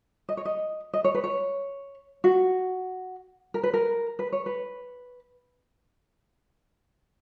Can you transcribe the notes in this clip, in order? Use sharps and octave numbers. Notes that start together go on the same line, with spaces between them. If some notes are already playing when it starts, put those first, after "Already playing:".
D#5
C#5
D#5
D#5
C#5
B4
C#5
F#4
A#4
B4
A#4
B4
C#5
B4